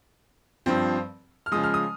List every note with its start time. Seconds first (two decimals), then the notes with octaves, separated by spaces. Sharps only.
0.66 G2 F3 C4
1.46 F6
1.52 C#3 F3 G#3 D#6
1.64 F6
1.74 D#6